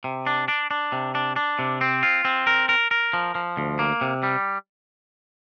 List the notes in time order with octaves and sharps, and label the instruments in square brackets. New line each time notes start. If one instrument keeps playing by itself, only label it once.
[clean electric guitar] C3
D4
D4
D4
C3
D4
D4
C3
C4
F4
C4
A#4
A#4
A#4
F3
F3
D2
A#3
C3
G3